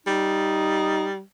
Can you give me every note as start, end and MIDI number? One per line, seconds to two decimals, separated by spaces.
0.07 1.21 55
0.07 1.08 63